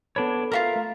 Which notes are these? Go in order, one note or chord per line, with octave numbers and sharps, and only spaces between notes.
B3 D4 A4 B4 C#5 B5
F4 F#4 A#4 E5 F5 A#5
A3